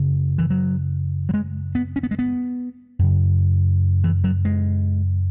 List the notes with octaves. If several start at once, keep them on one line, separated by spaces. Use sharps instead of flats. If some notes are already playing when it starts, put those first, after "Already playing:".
Already playing: F#2 C#3
E3
F#3
F#3
G#3
B3
C#4
B3
G#3
B3
F#2 C#3
E3
F#3
G#3